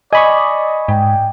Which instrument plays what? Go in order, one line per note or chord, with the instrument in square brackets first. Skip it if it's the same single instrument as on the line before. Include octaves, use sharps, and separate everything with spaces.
[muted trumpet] D5 [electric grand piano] D#5 [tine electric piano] G#5 B5 C#6
[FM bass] G#2 [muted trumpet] G5